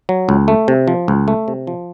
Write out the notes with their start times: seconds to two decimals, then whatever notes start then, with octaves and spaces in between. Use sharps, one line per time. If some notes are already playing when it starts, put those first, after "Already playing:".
0.09 F#3
0.29 C#2
0.48 A3
0.68 C3
0.88 F3
1.08 C#2
1.28 A3
1.48 C3
1.67 F3